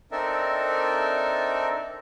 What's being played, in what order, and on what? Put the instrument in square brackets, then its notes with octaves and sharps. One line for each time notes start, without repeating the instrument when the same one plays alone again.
[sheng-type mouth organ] C4 D4 D#4 A4 A#4 E5